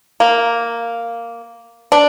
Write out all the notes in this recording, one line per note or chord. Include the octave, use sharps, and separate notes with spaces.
A#3
D4